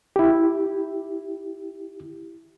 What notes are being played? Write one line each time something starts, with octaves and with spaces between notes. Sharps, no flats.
E4 G4